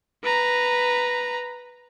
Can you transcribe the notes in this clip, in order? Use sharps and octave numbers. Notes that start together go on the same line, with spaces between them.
B4 A#5